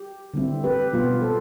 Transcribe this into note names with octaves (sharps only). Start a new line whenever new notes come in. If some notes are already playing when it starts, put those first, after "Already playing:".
Already playing: G4
D3 G3 C4 E4
G4 B4
B2 G3 B3 F4
A4 C5